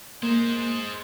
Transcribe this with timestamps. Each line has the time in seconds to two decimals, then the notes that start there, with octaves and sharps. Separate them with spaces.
0.23 G#3 A#3 C5